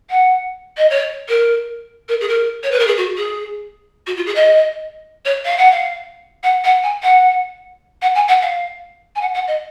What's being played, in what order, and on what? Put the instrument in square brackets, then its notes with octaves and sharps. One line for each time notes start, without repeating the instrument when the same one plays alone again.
[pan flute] F#5
D#5
C#5
A#4
A#4
G#4
A#4
C#5
B4
A#4
G#4
F#4
G#4
F#4
F4
G#4
D#5
C#5
F5
F#5
F5
F#5
F#5
G#5
F#5
F#5
G#5
F#5
F5
G#5
F#5
F#5
D#5